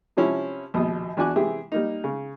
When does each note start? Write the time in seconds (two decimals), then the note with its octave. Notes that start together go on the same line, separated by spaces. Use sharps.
0.17 C3 F3 C#4 E4
0.74 A#1 D#2 B2 D#6
1.17 E2 D4 F#4 G#5 D6 F#6
1.36 C3 E3 G4 G#4 E5
1.72 G3 A#3 D#4
2.04 C#3